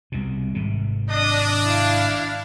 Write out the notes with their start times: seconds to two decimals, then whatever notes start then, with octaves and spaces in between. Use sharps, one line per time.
0.12 C2 B2
0.55 G#1 C3
1.10 D4 D#5 D#6
1.65 E4 F5